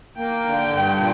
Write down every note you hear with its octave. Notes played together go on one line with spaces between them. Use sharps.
A#3 G5
D3
G2
A#2